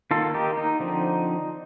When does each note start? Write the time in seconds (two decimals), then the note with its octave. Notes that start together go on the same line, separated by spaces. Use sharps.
0.11 D#3 A#3 F4 A4
0.34 D#4 G4
0.57 D#4
0.80 D3 F3 C4